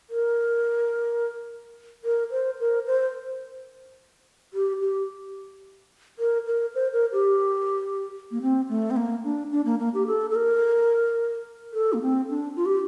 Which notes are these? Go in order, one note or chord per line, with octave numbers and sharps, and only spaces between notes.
A#4
A#4
C5
A#4
C5
G4
G4
A#4
A#4
C5
A#4
G4
A#3
C4
A3
C4
A#3
D4
D4
A#3
A#3
G4
A4
A4
A#4
A4
A#3
C4
D4
F4
G4